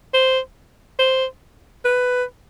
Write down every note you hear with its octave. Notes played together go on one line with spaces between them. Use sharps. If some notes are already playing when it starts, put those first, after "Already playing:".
C5
C5
B4